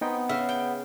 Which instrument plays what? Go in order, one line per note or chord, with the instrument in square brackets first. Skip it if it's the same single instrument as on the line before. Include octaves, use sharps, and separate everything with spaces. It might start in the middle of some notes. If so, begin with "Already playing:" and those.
[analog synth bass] B3 [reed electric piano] C4 D#4 G5
[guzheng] C#3 [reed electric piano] E5
[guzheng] G5